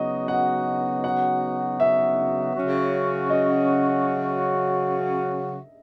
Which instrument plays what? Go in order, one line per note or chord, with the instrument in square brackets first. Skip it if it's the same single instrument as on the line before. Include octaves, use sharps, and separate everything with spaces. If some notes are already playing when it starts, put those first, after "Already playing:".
Already playing: [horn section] C#3 F#3 B3 D#4 F#4 [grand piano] D#5
[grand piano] F#5
F#5
E5
[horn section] C#3 F#3 C#4 F#4
[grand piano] D#5